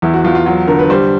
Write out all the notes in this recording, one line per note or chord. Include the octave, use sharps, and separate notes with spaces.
E2 E4
F#4
E2 F4
F4
F#3 F4
D3 A#4
B4
G3 C5